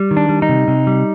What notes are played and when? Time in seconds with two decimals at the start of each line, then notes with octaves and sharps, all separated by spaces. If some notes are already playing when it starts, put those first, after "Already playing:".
Already playing: G3
0.11 D#3
0.17 D4
0.29 G3
0.42 D#4
0.49 C3
0.68 C3
0.87 G3